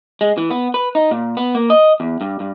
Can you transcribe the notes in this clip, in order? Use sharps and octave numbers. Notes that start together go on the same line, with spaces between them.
G#3
E3
B3
B4
D#4
A#2
B3
A#3
D#5
E2
G2
G2